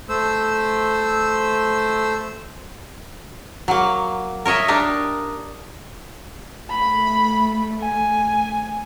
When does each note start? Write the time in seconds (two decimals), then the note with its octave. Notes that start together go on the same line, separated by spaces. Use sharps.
0.09 A3 C5 E6
3.68 F#3 A#3
4.45 A#4 C#5 D#5 E5
4.68 D4 D#4 G4 A#4
6.70 A3 B5
7.79 G#5